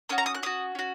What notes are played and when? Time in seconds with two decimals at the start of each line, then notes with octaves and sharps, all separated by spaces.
0.09 C#4 F#4 D#6
0.18 A#5
0.26 D#6
0.35 F#6
0.43 C#4 F#4 D#6
0.75 C#4 F#4